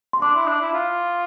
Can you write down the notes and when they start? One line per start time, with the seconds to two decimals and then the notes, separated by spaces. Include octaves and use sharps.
0.13 C6
0.22 D4 D6
0.35 E4
0.47 D4
0.60 E4
0.73 F4